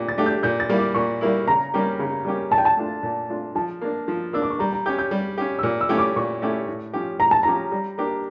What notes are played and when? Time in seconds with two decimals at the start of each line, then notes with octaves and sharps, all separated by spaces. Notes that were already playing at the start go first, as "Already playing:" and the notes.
Already playing: A#2 A3 D4 G4
0.09 A6
0.18 A3 D4 G4
0.26 G6
0.43 A#2 G6
0.60 A6
0.69 G3 A#3 E4
0.78 D6
0.95 A#2 C#6
1.21 G3 A#3 E4
1.47 C#3 A#5
1.74 G3 A#3 C#4 G4
1.99 C#3
2.25 G3 A#3 C#4 G4
2.51 A#2 A5
2.58 G5
2.65 A5
2.77 A3 D4 F4
3.03 A#2
3.29 A3 D4 F4
3.55 F3 A5
3.81 A#3 D4
4.08 F3
4.33 A#3 D4 E6
4.42 D6
4.50 C#6
4.59 G3 A#5
4.73 A#5
4.86 C#4 G4 G6
4.99 G6
5.11 G3
5.38 C#4 G4
5.59 E6
5.63 A#2 F6
5.81 E6
5.89 A3 C#4 E4 G4
5.98 D6
6.16 A#2 C#6
6.42 A3 C#4 E4 G4
6.68 A2
6.93 F3 C#4 G4
7.20 A2 A#5
7.31 A5
7.43 F3 C#4 G4 A#5
7.72 G3
7.98 A#3 D4 G4